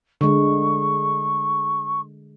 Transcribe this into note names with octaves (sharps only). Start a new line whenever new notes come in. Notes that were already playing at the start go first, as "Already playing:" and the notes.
D3 G#3 C#6